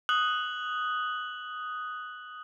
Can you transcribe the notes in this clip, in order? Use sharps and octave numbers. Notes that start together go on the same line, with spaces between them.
D#6 F#6 F#7